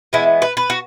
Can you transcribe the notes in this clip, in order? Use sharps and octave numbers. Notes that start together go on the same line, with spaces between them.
E3 G#3 B3 E4
B4
B4
F#4